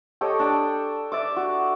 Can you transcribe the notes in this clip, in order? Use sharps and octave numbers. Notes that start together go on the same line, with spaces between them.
G4 A4 C#5 D#5
D4 D5 G5
D5 E5 D6
F#4